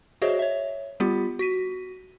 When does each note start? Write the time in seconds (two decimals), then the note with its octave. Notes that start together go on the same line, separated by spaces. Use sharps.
0.22 F#4 G#4 C5 C#5 D#5 E5
0.39 C#5 E5
1.00 G3 B3 F4 G4
1.39 F#4 B6 D#7